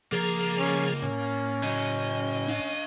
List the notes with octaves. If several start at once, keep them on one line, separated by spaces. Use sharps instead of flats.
C#2 F3 A#3 G#4 A#5
C#4
A2 C#4
C#3 F#3 D#5
D4 F5